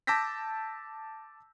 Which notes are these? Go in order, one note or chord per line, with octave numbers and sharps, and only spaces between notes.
A5 D6 E6 G6 A#6 B6